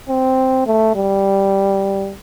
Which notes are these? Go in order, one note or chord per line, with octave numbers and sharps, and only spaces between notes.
C4
A3
G3